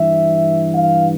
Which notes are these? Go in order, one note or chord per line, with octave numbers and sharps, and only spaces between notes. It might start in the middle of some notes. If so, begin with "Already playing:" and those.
Already playing: G2 E3 E5
F5